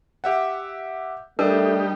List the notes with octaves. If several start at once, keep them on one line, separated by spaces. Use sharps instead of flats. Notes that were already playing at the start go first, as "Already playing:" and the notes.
G4 E5 F#5
G3 A3 D4 D#4 G4 A#4